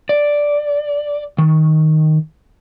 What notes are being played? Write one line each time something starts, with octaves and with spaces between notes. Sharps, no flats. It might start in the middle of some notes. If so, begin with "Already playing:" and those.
D5
D#3